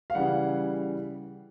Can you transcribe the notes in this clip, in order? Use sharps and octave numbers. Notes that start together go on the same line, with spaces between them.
F5
C#3 E3 G3 F#5